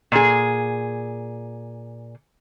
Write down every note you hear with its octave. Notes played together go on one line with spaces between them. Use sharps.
A#2 G#4